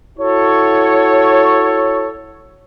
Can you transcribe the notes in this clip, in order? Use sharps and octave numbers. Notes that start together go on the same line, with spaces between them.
E4 F#4 A4 C#5